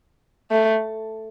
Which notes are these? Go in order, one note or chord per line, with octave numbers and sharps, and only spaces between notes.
A3